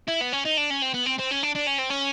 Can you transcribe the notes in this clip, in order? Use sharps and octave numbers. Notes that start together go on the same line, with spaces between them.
E4
B3
C#4
D#4
D4
C#4
C4
B3
C4
C4
C#4
D4
D4
C#4
C4
C#4